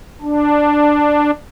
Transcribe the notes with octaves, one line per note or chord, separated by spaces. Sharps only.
D4